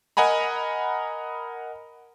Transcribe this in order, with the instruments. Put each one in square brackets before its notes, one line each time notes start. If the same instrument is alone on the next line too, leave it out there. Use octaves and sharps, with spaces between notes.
[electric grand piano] A#4 D#5 F#5 G#5 A#5 B5